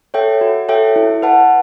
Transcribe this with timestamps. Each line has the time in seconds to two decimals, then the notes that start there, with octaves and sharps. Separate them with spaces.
0.14 A4 C#5 E5 G5
0.41 F#4
0.69 A4 C#5 E5 G5
0.96 E4
1.22 B4 F#5 A5